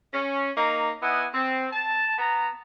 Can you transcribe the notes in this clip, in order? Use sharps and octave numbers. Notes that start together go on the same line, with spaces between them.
C#4
A#3 D#4 A#5
B3 E4 D#5 F#5 G#5
C4
A5
B3 A#5